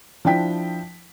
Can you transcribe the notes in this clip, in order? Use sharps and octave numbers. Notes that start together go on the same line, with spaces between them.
F3 D4 E4 G5 B6